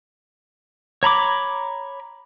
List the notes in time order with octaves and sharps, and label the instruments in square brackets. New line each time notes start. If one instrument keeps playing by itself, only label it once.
[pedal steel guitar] C#5 A#5 B5 D6